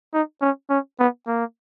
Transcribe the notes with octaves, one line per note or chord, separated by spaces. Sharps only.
D#4
C#4
C#4
B3
A#3